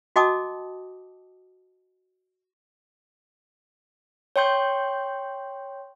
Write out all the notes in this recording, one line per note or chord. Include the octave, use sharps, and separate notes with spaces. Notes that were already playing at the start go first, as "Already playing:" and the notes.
F#4 D#5 G5 A5 D6 D#6
C#5 G5 C6 G6